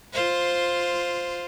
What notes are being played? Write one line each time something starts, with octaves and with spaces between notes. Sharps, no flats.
F4 C5